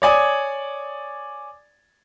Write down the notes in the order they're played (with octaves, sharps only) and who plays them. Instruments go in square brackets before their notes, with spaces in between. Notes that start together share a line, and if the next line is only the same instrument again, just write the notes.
[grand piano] C#5 D5 G#5 D#6